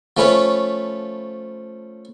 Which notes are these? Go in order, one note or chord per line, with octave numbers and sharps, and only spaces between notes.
F3 A3 C#4 B4 C#5